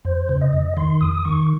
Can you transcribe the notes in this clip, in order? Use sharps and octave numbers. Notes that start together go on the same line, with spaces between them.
F2 C5
C#3
D#5
F2
D#3 C6
F2 D#6
D#6
D#3 C#6